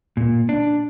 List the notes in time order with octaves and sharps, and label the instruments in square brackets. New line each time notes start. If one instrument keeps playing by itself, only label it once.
[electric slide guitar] A#2
D4